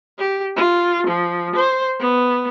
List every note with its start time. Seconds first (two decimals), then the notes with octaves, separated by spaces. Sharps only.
0.19 G4
0.56 F4
1.07 F3
1.56 C5
2.00 B3